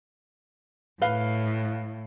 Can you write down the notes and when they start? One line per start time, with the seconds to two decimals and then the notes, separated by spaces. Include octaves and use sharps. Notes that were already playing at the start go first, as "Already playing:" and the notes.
1.02 A2 B4 F5 G7